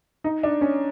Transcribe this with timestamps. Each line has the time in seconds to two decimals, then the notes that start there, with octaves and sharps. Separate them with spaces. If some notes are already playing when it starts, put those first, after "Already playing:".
0.24 D#4
0.43 D4
0.61 C#4